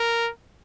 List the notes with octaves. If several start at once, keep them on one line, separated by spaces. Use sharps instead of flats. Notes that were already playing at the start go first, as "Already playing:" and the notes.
Already playing: A#4